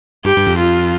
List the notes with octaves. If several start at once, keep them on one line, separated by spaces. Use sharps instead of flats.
G2 G4
G2
F2
F4